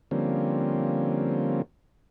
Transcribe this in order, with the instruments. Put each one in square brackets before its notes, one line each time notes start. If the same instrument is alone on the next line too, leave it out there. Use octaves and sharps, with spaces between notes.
[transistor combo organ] D3 F3 G3 A#3 C4 C#4